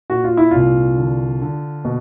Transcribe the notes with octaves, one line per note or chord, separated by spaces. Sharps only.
A#2 F#4
F4
E4
C2 F4
D3
D3
B2